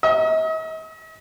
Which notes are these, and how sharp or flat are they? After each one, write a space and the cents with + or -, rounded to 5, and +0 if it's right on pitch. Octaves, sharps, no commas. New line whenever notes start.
D#5 +45